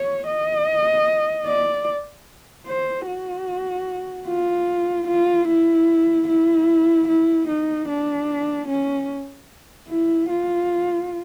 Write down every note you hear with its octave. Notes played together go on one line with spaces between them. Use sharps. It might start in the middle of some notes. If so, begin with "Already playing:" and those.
Already playing: C#5
D#5
D5
C5
F#4
F4
F4
E4
E4
E4
D#4
D4
C#4
E4
F4